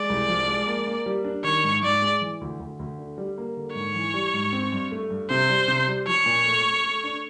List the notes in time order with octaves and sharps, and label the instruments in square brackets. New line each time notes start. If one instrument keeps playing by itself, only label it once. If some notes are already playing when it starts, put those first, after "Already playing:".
Already playing: [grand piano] G#3 [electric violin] D5
[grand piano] C2
F3
G#3
A#3
A#3
G3
D4
[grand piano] D#3 [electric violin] C#5
[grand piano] G#2
[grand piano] G#2 [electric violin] D5
[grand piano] G#3
E3
D2
D2
D2
D3
G3
A#3
D3
[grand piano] G#2 [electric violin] C#5
[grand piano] E3
G3
G#2
C4
G2
A3
G2
[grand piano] C3 [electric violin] C5
[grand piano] G3
C3
G3
[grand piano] F3 [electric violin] C#5
[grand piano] A#2
A3
A3
A3
D4